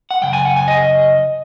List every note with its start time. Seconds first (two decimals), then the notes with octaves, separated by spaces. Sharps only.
0.11 F#5
0.22 F#2 C#3 G5
0.33 G#5
0.45 F#5
0.56 G#5
0.68 D#5